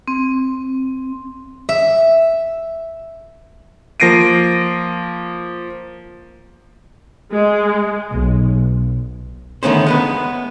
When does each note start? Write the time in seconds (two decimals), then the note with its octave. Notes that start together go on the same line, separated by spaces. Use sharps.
0.08 C4
1.69 E5
4.00 F3 A#3 A#6 C7 D7 D#7
7.31 G#3
8.12 B1
9.63 D3 D#3 A3 B3 C#4 C5
9.87 G#3 B3 B4